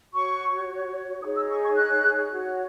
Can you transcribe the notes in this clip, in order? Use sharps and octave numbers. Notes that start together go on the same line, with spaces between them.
F#4 C#5 C#6
D#4 G#4 C#5 D#6
E6
C#6
C#6
F#6
F#4 C#5